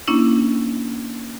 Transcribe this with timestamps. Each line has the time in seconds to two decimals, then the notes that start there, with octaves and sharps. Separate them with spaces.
0.08 A#3 C#4 D4 E4